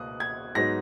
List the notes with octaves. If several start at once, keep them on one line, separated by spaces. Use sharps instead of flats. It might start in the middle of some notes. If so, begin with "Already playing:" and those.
Already playing: C#2 B2 A#3 D#6 F#6
G#6
G#2 F#3 B3 D#4 A#6